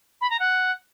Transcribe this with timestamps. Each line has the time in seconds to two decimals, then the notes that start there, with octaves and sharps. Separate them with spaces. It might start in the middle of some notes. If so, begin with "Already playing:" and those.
0.21 B5
0.30 A#5
0.40 F#5